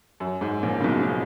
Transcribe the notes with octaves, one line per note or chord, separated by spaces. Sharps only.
F#2
G#2
A#1 A#2
C#3
B1 B2
B2
A#2